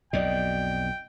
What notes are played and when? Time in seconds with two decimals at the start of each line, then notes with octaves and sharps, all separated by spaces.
0.13 B1 F2 B2 D5 D#5 G5